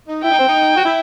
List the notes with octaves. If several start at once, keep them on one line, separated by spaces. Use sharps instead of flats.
D#4
E4 G5
D#4
C4
D#4
F#4
E4